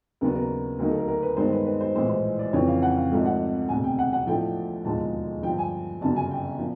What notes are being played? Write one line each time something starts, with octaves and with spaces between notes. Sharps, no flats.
D#2 C#3 F#3 B3 D4 A#4
A#4
D2 D3 F#3 A#3 D#4 A#4
A4
A#4
A#4
B4
G2 D#3 G#3 B3 C5
B4
B4
C5
A#1 A2 E3 G#3 C5
C5
D5
F2 C#3 E3 C#5
F5
F#5
F5
G#1 G#2 F3 A3
F#5
E1 D2 C3 G#5
G5
F#5
F#5
A1 A2 F3 A3 D4 G5
E1 D#2 D3 F3 G#3 A5
G2 D3 F3 G5
G#5
G1 F#2 C#3 A5
G#5
G5
A#2 F3